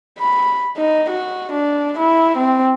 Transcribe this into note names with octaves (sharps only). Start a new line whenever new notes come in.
B5
D#4
F#4
D4
E4
C4